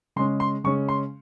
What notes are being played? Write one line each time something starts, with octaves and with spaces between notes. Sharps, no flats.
C#3 G#3 C#4 C6
C6
C#3 G#3 C#4 C#6
C6